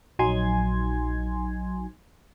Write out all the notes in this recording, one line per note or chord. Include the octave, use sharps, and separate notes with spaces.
A#1 F#3 D#4 G#5 C6 G#6